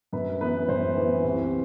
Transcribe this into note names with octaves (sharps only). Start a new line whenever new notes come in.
F#2 B4
E3 B3 B4
F#2 C5
E3 B3
C2